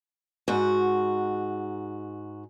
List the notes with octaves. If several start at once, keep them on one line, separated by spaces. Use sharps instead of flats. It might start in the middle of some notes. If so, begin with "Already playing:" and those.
G#2 F#4